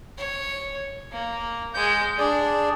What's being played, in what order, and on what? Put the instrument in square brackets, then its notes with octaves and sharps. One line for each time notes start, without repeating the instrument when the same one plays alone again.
[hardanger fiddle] C#5
A#3
[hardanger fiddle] G#3 [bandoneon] G6
[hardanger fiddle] D4 [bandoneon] G#4 D5